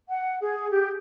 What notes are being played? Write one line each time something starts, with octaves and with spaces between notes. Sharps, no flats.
F#5
G#4
G4